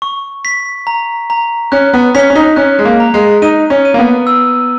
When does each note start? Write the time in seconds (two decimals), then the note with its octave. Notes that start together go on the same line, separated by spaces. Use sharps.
0.02 C#6
0.45 B6
0.87 A#5
1.30 A#5
1.72 C#4 F#6
1.93 B3
2.15 C#4 B6
2.30 C#4
2.36 D#4
2.56 C#4 F#6
2.79 G#3
2.85 A#3
3.00 A#5
3.14 G#3
3.42 D#4 D#7
3.70 C#4
3.85 D#7
3.94 A#3
3.99 B3
4.27 E6